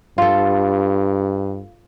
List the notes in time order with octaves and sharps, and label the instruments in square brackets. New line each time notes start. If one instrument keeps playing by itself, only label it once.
[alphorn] G2 [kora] F4 A4